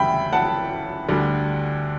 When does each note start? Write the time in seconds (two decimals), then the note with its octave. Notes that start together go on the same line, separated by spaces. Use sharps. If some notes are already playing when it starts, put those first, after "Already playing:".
Already playing: D2 C#3 E3 G3 E5 G5 B5
0.33 F#5 A5
1.08 D2 D3 G3